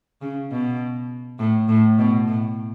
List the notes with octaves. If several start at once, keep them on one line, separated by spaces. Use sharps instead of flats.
C#3
B2
A2
A2
B2
A2